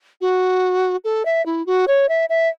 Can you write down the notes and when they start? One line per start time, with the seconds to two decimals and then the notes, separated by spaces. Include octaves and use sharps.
0.21 F#4
1.04 A4
1.25 E5
1.46 E4
1.66 F#4
1.88 C#5
2.09 E5
2.29 E5